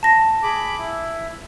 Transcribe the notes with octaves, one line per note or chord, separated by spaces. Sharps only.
A5 A#6
G#4 B5 D6
E4